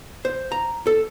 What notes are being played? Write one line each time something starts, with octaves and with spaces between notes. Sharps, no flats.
C5
A#5
A4